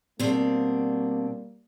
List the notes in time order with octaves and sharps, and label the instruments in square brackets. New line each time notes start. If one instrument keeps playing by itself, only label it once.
[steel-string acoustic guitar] B2 C4 D4 [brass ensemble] G3 A#3